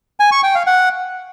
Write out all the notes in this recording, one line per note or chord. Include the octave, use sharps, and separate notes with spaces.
G#5
C#6
G5
F5
F#5